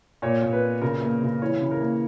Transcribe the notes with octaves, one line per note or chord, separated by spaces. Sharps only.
A#2 C#5
A#2
B4
B3
C#3 A#4
A#3
C#3
E3 C#5
C#3
A#4
A#3